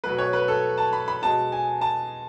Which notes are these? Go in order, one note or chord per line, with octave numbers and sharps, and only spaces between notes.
B2 F#3 A3 B4
C#5
B4
A4
A5
B5
B5
B2 G#3 A5
G#5
A5